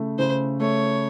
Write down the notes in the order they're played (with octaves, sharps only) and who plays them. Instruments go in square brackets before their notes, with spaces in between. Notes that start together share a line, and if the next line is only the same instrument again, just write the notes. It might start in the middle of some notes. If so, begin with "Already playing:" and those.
Already playing: [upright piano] C#3 A3
[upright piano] C#3 [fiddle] C5
[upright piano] A3 [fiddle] C#5